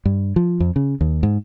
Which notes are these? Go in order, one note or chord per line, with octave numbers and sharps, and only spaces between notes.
G2
F3
F2
C#3
D#2
G#2